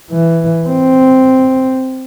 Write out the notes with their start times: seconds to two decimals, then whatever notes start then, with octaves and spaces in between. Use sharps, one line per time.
0.11 E3
0.68 C4